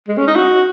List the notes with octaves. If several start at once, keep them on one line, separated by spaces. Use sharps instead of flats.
G#3
C#4
D#4
F#4